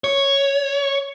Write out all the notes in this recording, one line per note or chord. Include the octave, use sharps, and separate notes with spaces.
C#5